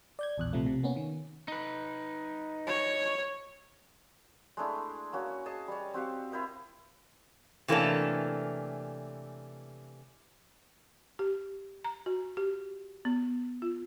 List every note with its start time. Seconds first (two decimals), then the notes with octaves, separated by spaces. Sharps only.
0.19 D5 G6 G#6
0.38 A#1 E2 F#6
0.53 B1 C3 F3 A3
0.66 C3
0.83 A#3 B3 C#4
0.96 D#3
1.48 D#4 B4
2.67 C#5
4.57 G#3 A3 D4 E4
5.13 A#3 C#4 F#4
5.46 G#4 D#5 A5
5.68 G3 C#5
5.94 C4 F#4 G4 F5
6.32 E4 A#4 C5 D#5
7.68 C3 E3 A3 A#3 C#4 D4
11.19 G4
11.84 A#5
12.06 F#4
12.37 G4
13.05 B3
13.62 F4